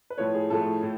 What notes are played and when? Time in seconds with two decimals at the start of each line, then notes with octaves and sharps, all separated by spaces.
0.10 B4
0.18 A2 F3 A3 C#5
0.35 G#4
0.50 A2 F3 A3 A4
0.83 A2